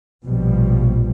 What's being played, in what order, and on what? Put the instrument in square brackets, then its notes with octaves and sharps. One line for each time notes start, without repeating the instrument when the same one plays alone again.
[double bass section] A#1 B2 F3 G3